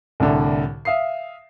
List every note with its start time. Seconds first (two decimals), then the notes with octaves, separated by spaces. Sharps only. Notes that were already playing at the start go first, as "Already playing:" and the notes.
0.20 C2 A2 D3
0.85 E5 F5 D#6 C7